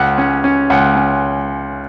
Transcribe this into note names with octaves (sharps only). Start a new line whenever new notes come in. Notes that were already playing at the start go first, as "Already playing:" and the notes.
Already playing: C#2 F#5
C#4
C#4
C#2 F#5
C#4